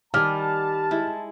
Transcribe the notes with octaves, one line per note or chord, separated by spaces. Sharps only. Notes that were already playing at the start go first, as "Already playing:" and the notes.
D#3 G3 G#5 A5 F6
G#3 E4